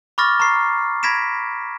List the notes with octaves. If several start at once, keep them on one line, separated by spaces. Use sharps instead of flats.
B5 C#6 D6 F6 A6 A#6
A#5 C#6 C7
B5 G#6 A#6 B6 D7 E7